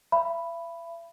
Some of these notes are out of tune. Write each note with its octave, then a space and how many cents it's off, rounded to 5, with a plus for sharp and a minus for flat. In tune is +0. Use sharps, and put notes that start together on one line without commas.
E5 +40 B5 +0